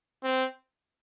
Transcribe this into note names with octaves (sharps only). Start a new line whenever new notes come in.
C4